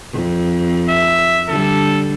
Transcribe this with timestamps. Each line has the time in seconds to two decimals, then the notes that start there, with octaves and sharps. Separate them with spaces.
0.13 F2
0.90 E5
1.49 D3 G3 A4